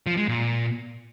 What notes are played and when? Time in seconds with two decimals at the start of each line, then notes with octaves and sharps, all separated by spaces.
0.07 F3
0.17 G#3
0.28 A#2